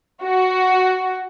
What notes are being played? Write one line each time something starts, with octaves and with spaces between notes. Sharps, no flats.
F#4